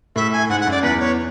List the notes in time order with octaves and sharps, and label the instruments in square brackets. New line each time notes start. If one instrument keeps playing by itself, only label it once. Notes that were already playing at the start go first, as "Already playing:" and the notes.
[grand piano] A2 [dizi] E5
[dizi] G#5
[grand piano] G#2 [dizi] F#5
[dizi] F#5
[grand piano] F#2
[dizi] D5
[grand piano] E2 [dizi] B4
[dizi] C#5